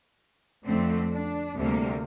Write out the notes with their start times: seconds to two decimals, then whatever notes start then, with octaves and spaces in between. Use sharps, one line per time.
0.65 F2 D3 A3 C4
1.11 D4
1.55 D2 C3 G3 A#3